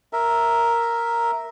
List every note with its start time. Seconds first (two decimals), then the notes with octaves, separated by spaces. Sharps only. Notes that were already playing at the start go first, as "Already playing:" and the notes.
0.13 A#4 E5